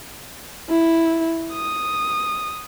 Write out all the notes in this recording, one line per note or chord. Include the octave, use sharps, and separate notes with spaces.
E4
D#6